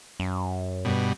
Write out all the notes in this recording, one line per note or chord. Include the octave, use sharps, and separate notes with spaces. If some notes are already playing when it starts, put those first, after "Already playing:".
F#2
G2 B2